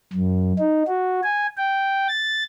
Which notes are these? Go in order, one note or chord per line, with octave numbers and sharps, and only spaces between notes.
F#2
D#4
F#4
G#5
G5
A6